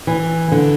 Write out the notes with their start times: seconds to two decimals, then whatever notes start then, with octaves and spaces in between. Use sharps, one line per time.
0.07 E3
0.52 D3